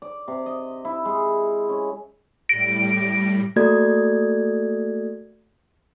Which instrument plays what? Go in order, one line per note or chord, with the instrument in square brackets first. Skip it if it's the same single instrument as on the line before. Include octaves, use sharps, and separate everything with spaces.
[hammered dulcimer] D5
C3
D#5
E4
G#3
C#4
[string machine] A2 G3 [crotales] A#6 [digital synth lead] D7
[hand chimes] A3 A#3 F#4 A4 D5 G#6